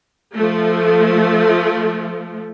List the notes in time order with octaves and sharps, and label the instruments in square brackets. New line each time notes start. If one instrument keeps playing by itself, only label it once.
[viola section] F3 A3